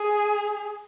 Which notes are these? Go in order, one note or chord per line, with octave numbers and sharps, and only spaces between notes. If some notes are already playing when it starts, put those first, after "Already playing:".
Already playing: G#4